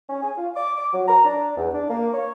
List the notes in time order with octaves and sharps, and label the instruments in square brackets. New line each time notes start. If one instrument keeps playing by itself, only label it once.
[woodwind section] C#4
G#5
F4
D6
D6
F#3
A#5
D4
E2
D4
A#3
C#5